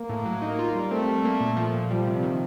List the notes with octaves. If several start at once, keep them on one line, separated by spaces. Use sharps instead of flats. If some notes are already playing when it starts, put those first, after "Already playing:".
Already playing: A#3
A2
F#3
D#4
F4
G3
A3 C4
G3
A#3
A#2
F3
A#2
F3 G3
C3
D#3